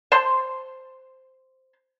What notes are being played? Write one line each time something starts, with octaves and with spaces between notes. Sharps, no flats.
C5 A5 C6